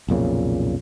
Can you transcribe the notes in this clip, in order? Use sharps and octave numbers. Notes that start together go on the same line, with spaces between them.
B1 F2 A#2 C#3